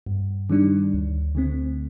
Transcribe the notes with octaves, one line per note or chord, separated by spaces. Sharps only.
G2
D#3 G3 D4
D2
D3 A3 C4